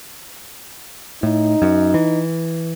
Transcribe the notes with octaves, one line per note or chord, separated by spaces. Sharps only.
A2 D#4
F#2
E3